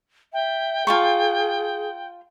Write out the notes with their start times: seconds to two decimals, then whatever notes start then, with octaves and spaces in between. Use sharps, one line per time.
0.33 E5 G5
0.87 F4 G#4 A5 C#6